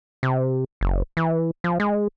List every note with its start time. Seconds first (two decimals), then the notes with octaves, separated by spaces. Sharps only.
0.23 C3
0.81 F#1
1.17 E3
1.64 F3
1.80 G#3